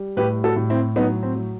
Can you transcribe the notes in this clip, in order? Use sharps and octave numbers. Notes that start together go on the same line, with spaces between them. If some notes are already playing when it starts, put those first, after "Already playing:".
Already playing: G3
A2 G4 B4
F#4 A4
A2
C4 E4
F#3 B3 D#4
C4
F#3